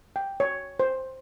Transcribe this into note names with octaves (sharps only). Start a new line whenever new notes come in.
G5
C#5
C5